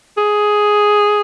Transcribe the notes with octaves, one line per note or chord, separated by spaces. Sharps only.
G#4